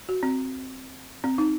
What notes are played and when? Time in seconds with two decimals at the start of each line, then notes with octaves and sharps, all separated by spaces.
0.09 F#4
0.23 C4
1.24 C4
1.38 D#4